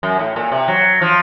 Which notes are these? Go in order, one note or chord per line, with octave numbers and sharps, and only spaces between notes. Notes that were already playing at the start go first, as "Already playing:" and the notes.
F#2
A2
A#2
C3
F#3
F3